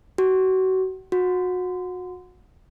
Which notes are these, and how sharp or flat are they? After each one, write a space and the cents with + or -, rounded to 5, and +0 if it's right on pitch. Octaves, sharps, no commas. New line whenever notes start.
F#4 +30
F#4 -25